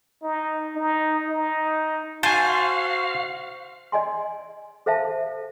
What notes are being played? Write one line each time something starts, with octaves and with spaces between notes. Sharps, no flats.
D#4
D#4
D#4
F#4 C5 F5 G#5 A5
D5 D#5 G#5 C6
A4 C5 E5 F5 A5